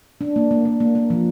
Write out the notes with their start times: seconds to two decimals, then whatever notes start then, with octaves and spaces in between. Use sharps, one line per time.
0.21 D4
0.36 A#3
0.51 A#3
0.65 A#3
0.80 A#3
0.95 A#3
1.10 F3